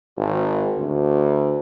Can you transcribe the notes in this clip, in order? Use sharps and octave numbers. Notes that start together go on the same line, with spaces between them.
G#1
D2